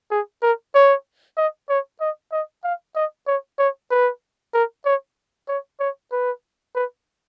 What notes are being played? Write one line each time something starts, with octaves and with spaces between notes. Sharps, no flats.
G#4
A#4
C#5
D#5
C#5
D#5
D#5
F5
D#5
C#5
C#5
B4
A#4
C#5
C#5
C#5
B4
B4